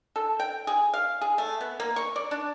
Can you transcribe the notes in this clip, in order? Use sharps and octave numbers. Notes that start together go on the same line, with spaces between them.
A4
G5
G#4
F5
G#4
A3
B3
A#3
C#6
D5
D4